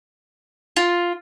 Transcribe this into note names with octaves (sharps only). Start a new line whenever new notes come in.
F4